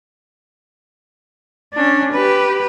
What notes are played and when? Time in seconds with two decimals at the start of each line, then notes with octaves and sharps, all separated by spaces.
1.73 C#4 D4
2.13 G4 B4